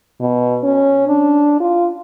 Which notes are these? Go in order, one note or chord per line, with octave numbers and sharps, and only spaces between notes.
B2
C#4
D4
F4